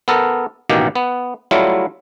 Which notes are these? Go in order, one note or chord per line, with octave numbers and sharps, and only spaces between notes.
B3 A4 A#4
A1 B2 D#3 A#3 G4
B3
F#3 G3 A3 E4 F4